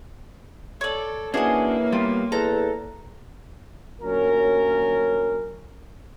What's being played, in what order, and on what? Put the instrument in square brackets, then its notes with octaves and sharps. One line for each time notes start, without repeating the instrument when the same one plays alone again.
[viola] A4 [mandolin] C#5 D5
[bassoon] E3 [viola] F#3 A#3 [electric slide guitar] C#4 D4 F#4 [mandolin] G#4 D#5
[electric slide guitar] G3 B3 G4 [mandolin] F4
[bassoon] E2 [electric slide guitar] A4 [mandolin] A#5
[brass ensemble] D2 A#2 F#3 C#4 A#4